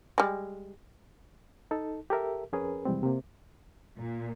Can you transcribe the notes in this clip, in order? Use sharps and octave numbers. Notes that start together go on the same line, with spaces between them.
G3 G#3
D#4 A4
G4 A4 A#4 E5
F2 C#4 G#4 A#4 B4
F2 C3 E3 G3 G#3 C4
C3 A#3
A#2